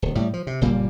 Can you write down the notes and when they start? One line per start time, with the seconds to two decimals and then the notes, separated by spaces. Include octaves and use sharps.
0.02 D1
0.15 A2 G3
0.33 F3
0.47 C3
0.61 F#1 A#2 G3 A#3